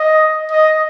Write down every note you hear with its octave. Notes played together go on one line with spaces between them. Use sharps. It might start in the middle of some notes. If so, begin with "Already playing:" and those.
Already playing: D#5
D#5